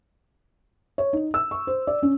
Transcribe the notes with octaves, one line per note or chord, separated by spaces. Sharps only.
C#5
D#4
E6
C#6
C5
D5
C#4